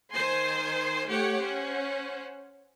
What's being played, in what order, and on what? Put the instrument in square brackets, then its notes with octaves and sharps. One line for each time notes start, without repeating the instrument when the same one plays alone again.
[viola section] D#3 C5 G#5 C6
A3 G4 C#5 F#5
C#4 C5 F#5